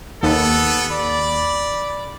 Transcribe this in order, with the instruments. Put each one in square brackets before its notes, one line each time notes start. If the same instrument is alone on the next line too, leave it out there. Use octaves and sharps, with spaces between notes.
[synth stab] D#2 [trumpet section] B3 A4
[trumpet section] D5 B5